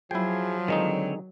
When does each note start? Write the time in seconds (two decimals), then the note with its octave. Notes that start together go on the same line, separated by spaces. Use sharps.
0.11 F3 F#3 E4 G#4 G5
0.68 D3 D#3 G#3 C4 D#4 C#5